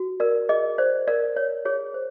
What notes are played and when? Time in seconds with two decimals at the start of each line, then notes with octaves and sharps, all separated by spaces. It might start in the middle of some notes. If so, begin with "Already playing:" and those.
Already playing: F#4
0.20 A#4 D5
0.49 G#4 D#5
0.78 C5 D5
1.08 A#4 D5
1.36 C#5
1.65 G#4 C#5
1.94 C5